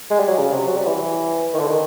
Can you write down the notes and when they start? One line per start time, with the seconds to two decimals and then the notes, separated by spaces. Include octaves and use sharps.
0.11 G#3
0.20 G3
0.29 F#3
0.39 C#3
0.52 C3
0.68 F#3
0.77 G3
0.86 E3
1.53 D#3
1.60 D3
1.67 D#3